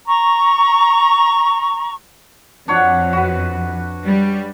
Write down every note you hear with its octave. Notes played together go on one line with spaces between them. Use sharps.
A#5 C#6
F2 D4 C#5 F#5
F#4 B4
G3